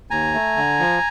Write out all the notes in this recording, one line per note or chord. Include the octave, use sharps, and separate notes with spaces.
D#2 G#5 A#5
A3
D3
F3